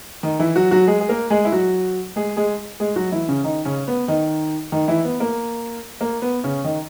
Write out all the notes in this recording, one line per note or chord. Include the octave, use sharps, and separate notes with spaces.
D#3 D#4
E3 E4
F#3 F#4
F#3 F#4
G#3 G#4
G#4
A#3 A#4
G#3 G#4
E4
F#3 F#4
G#3 G#4
G#3 G#4
G#3 G#4
F#3 F#4
E3 E4
C#3 C#4
D#3 D#4
C#3 C#4
B3
D#3 D#4
D#3 D#4
E3 E4
B3
A#3
A#3
B3
C#3 C#4
D#3 D#4